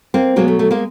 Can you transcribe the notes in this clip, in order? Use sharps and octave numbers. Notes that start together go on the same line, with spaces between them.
A#3 C4
B2 F#3 G#3 A#3
A3
A3
G#3 A#3